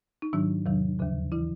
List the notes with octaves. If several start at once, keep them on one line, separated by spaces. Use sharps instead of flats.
D#4
G#2 D#3 F#3 D4
E2 C3 D#3 F#3
D#2 C#3 F3
E3 E4